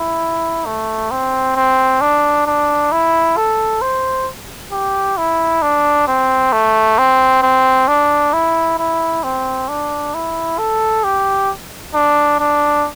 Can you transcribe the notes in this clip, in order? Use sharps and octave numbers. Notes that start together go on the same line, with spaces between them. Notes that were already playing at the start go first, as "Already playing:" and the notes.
Already playing: E4
A3
C4
C4
D4
D4
E4
A4
C5
G4
E4
D4
C4
A3
C4
C4
D4
E4
E4
C4
D4
E4
A4
G4
D4
D4